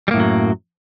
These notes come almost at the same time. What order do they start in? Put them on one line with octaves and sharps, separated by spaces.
G3 A#3 A2 F#2 F#3